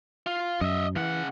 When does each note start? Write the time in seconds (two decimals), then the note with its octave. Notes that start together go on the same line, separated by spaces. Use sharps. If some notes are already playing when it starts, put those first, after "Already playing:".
0.26 F4
0.61 F#2 D#5 E5
0.96 C#3 E3 F#5